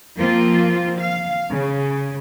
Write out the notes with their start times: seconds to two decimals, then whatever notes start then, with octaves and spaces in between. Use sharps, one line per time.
0.18 F3 A#3 C4 F4
1.00 F5
1.52 C#3